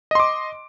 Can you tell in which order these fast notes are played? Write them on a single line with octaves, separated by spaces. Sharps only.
D#5 C6 D6